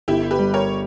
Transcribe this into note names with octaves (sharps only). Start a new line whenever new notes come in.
G1 E4 G4
G4 B4
G3
A#4 C#5